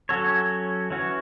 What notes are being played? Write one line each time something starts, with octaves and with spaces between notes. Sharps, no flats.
F#3 C#4 F#4 A4 C#5
E3 C#4 F#4